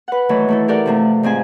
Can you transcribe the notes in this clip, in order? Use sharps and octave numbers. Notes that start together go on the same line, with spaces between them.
B4 F#5
D#3 E3 F#3 A3
A3 E4 A4
G4 A4 A#4 D5 F#5
C3 F3 A3
G#2 F3 C4 G#5